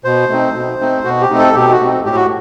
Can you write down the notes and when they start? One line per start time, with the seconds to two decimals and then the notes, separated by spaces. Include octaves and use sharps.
0.04 B2 C5
0.29 A3 C4 D#4
0.55 B2
0.80 A3 C4 D#4
1.04 B2 F#4
1.21 G4
1.30 A3 C4 D#4
1.38 A4
1.55 B2 G4
1.72 F#4
1.80 A3 C4 D#4
2.05 A2 G4
2.16 F#4